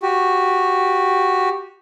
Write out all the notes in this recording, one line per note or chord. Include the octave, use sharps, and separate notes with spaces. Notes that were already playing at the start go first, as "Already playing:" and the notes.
F#4 G4